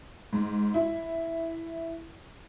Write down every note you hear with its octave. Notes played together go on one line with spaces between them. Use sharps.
G#2
E4